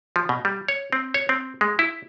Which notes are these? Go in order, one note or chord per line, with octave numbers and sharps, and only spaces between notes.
F3
B2
G3
C#5
C4
C#5
C4
G#3
E4